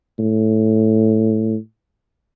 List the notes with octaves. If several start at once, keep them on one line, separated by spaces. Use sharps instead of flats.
A2